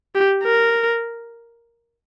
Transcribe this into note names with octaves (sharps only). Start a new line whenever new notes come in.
G4
A#4